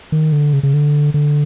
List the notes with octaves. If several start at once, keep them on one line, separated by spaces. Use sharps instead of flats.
D#3
D3
C#3
C#3
D3
D3